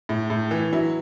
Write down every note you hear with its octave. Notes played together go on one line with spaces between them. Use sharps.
A2
A2
E3
F#3 E4